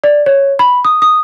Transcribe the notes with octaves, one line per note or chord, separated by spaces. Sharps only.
D5
C#5
B5
D#6
D#6